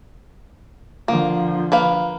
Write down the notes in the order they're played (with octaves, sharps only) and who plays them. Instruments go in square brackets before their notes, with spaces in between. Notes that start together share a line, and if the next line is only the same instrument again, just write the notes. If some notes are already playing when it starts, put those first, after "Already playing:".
[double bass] D3 F3 [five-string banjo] A#3
[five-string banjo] A#3 B4 F5